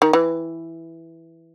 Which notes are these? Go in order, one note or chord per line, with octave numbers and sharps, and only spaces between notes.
D#3
E3